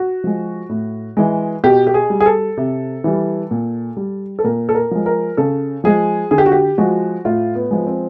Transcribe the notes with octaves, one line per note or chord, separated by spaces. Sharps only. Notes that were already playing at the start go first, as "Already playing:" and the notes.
Already playing: F#4
F3 G#3
A2
E3 G#3
B2 G4
G4
G#4
G3
G#4
A4
C3
E3 G3
A#2
G3
A4
A#2 A#4
A4
A#4
F3 G#3
A#4
C#3 A4
F3 G#3 G#4
D3 G#4
G4
F#4
G4
F3 G#3 F#4
A2 F4
B3
F3 G#3
C4